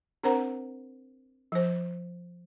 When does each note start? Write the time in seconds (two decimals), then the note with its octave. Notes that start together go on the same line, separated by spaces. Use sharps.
0.23 C4 D4 A#4 C5 F#5 A#5
1.52 F3 C5